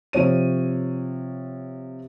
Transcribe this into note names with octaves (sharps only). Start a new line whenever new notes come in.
C3 F3 C#5 D#7